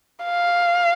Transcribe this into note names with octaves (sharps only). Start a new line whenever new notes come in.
F5